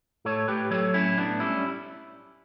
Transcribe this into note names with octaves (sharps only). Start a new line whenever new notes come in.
A2 A4 C#5
A2 G4 B4
F#3 A4 C#5
A2 C#4 E4
A2 B3 D4
G3 C#4 E4